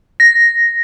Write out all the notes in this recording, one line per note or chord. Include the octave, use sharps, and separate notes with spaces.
A#6